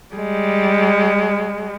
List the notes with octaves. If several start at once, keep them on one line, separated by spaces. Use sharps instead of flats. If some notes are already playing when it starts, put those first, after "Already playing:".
G3 G#3